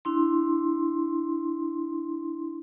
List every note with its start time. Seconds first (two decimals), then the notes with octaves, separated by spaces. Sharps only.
0.05 D4 E4 C6